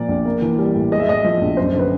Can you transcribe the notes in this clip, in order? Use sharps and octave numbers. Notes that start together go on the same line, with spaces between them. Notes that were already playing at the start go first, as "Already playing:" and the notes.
Already playing: A#2 F3 A#3 D5
A#1
A#3
E3
G3
A2
G#3 D#5
E5
A2 D#5
F3
A#1
F#2 C5
D3
B4